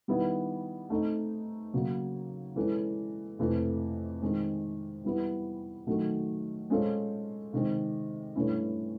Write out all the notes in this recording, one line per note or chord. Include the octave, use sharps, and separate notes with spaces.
D#3 G3 B3 E4
A3 C4 D#4
C#3 F#3 A#3
E3 G#3 C#4 E4 A4
F2 C3 E3 A3
D#3 G#3 C4
E3 G3 B3 E4
D#3 F#3 A3
G#3 C#4 F4 A4 C5
C3 D#3 G#3 C4
G2 E3 A3 C#4 E4